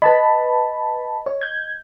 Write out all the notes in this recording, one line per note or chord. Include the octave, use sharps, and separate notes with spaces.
B4 D#5 A5 B5
C#5
G6 G#6